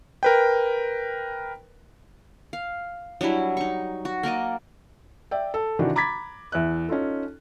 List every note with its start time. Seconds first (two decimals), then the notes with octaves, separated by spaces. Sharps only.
0.23 A#4 B4 G5
2.53 F5
3.21 F#3 G3 D4 E4
3.57 D#4 C#6
4.05 F#4
4.23 A#3 A#4 D5 D#5
5.31 D5 E5 G5
5.54 A4
5.79 C3 D#3 E3 D4 F#4
5.96 A#5 B5 D6 G#6 A6 B6
6.52 E2 E5 F#6
6.89 C#4 D#4 F4 A4